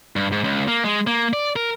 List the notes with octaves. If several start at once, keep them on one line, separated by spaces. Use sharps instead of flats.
G2
G#2
C#2
A#3
G#3
A#3
D5
A#4